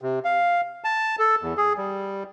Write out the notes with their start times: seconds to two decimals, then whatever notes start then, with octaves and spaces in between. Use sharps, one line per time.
0.01 C3
0.25 F5
0.84 A5
1.19 A4
1.42 E2
1.57 G#4
1.77 G3